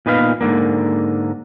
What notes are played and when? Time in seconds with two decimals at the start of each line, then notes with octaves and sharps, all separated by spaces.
0.06 A#2 B3 D#4 B4 F5
0.41 G#2 D3 A#3